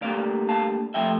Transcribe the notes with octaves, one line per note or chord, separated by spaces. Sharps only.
D2 D3 G3 A#3 D5 F5
F5 A5
C3 F3 A3 E5 G5